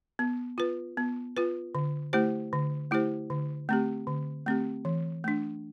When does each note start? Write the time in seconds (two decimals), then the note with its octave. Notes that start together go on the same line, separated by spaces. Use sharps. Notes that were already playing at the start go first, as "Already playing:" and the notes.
0.19 B3
0.58 F4 B4
0.97 B3
1.37 F4 B4
1.75 D3
2.13 A3 E4 G4 C5
2.53 D3
2.91 A3 E4 G4 C5
3.30 D3
3.69 A3 C4 G4
4.07 D3
4.46 A3 C4 G4
4.85 E3
5.24 A3 D4